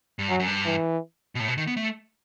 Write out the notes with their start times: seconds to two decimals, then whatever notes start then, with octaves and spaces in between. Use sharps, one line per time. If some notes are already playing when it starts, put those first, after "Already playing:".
0.19 G2
0.29 F#2 F#3
0.40 F#2
0.48 G2
0.66 E3
1.35 B2
1.40 A2
1.48 B2
1.58 D#3
1.67 B3
1.77 A3